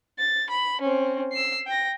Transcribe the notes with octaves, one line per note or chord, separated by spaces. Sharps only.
A6
B5
C4 C#4
E6 C7
G5 A#6